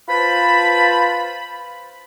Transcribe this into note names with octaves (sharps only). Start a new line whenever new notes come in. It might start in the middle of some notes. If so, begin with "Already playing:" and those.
F4 B4 C5 A5 B5